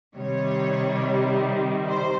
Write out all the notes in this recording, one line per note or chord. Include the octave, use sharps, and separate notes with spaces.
C3 D#3 G3 C#5
C5